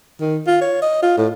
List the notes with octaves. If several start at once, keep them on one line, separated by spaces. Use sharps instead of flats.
D#3
F4
C#5
D#5
F4
A2